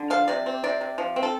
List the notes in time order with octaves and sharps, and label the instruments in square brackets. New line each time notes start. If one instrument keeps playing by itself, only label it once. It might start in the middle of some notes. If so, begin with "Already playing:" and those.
Already playing: [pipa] D3
F3 F5
C3 D5
C4
C3 D5
C3
F3
C4
A4